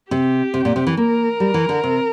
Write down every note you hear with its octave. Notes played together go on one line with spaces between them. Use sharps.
C3 G4
C3
A#2
C3
E3
A#3 A#4
G3
E3
D3
C3